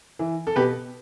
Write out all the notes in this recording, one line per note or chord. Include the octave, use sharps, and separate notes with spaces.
E3
A4
B2 G4 B4